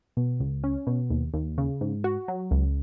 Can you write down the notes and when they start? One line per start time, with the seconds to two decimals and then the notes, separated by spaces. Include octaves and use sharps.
0.17 B2
0.40 C#2
0.64 C#4
0.87 B2
1.10 D#2
1.34 D#2
1.58 C#3
1.81 G#2
2.04 F#4
2.28 F#3
2.51 C#2